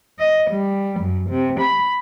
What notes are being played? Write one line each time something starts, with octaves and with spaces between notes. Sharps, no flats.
D#5
G3
F#2
C3
B5